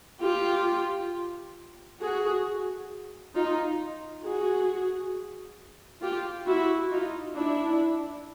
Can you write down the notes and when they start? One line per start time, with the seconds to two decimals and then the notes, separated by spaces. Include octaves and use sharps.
0.22 F4 G4
2.00 F#4 G#4
3.35 D#4 F4
4.23 F#4 G#4
6.02 F4 G4
6.46 E4 F#4
6.91 D#4 F4
7.35 D4 E4